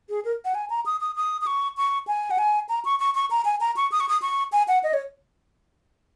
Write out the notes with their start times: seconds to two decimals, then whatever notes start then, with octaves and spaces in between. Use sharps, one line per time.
0.09 G#4
0.25 A#4
0.45 F#5
0.55 G#5
0.70 A#5
0.86 D#6
1.00 D#6
1.16 D#6
1.41 D#6
1.47 C#6
1.77 C#6
2.07 G#5
2.31 F#5
2.38 G#5
2.69 A#5
2.85 C#6
3.00 C#6
3.15 C#6
3.31 A#5
3.45 G#5
3.60 A#5
3.76 C#6
3.92 D#6
4.00 C#6
4.09 D#6
4.22 C#6
4.52 G#5
4.68 F#5
4.83 D#5
4.93 C#5